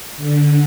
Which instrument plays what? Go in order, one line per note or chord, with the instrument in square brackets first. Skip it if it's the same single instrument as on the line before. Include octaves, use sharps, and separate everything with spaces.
[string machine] D3